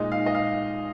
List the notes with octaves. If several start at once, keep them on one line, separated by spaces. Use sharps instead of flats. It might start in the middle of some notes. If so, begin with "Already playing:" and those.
Already playing: A#2 G#3 D#4 D#5
F5
D#5
F5